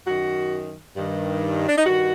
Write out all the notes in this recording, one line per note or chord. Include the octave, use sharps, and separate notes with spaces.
F#2 D#3 F#4
G2 D#3
D4
D#4
G2 D#3 F#4